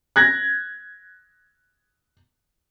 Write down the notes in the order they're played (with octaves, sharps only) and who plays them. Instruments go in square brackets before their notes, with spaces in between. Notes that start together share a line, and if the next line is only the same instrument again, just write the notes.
[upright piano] F#6 G#6 A#6